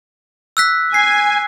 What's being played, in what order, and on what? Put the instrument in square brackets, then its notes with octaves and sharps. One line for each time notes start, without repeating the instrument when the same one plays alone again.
[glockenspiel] E6 F#6 B6
[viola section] G#5 [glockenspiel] C7